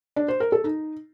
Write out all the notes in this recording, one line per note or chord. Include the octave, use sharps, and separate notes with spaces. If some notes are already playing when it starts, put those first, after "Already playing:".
D4
C5
A#4
A4
D#4